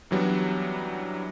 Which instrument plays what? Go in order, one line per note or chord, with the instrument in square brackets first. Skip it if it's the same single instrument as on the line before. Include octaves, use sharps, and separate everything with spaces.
[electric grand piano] F#2 E3 F#3 G3 B3 D4